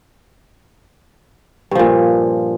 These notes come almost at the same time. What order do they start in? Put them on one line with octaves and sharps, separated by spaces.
G2 F3 A#2